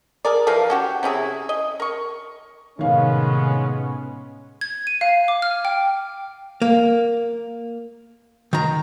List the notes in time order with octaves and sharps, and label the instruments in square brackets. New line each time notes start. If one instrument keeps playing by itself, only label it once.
[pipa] G#4 A#4 D5
E3 F3 A#4 F5
C#4 F#4 G4
C3 C#4 E4 G#4
D#5
A#4 C#6
[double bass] A2 C3 [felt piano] D#3 F5 [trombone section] G#3 B3 C#4
[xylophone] G#6
D#7
F5
D6
F6
G5
[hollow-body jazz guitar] A#3
D#3 A#5